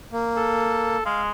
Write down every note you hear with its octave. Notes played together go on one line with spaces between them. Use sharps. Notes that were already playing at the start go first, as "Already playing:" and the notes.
A#3
A4
G#3 F5